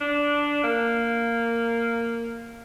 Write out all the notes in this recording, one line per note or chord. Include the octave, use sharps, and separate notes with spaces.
D4
A#3